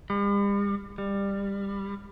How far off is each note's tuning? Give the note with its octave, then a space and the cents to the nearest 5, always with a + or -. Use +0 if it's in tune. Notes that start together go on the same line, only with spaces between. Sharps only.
G3 +45
G3 +20